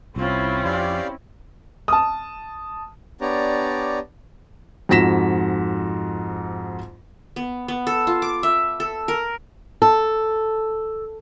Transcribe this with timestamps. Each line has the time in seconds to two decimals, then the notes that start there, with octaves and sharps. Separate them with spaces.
0.16 C2 C4 C#4 E4 F4
0.65 F2 G4 D5 F5
1.88 A5 D#6
3.21 B3 D4 G4 C#5 D5 A#5
4.89 F2 G#2 F#4 A#6 B6 E7
7.36 B3
7.68 B3
7.87 A4
8.07 F4
8.22 D6
8.43 E5
8.80 A4
9.08 A#4
9.82 A4